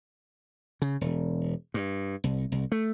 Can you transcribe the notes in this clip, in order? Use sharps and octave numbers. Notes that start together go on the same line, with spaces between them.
C#3
E1
G2
C2
C2
A3